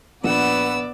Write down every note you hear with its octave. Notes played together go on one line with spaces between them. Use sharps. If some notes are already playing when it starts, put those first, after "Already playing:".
A#1 B3 B4 D5 F#5 E6